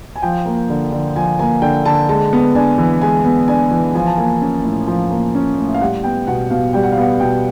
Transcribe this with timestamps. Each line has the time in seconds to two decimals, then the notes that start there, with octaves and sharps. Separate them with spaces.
0.16 G#5
0.22 F3 G5
0.46 A#3
0.69 D3
0.93 D3
1.16 F3 G#5
1.39 A#3 G#5
1.62 D3 G5
1.85 D3 A5
2.09 G#3 A5
2.33 B3
2.55 D4 G#5
2.78 E3
3.01 G#3 G#5
3.25 B3
3.48 D4 G#5
3.71 E3
3.95 F3 G#5
4.06 A5
4.18 A#3 G#5
4.42 C#4
4.64 A2
4.88 F3
5.11 A#3
5.35 C#4
5.58 A2
5.67 E5
5.74 F5
5.82 G3 F#5
6.04 B3 G5
6.27 B2 F#5
6.50 B2 F5
6.73 G3 G5
6.83 F#5
6.92 F5
6.97 B3 F#5
7.20 B2 G5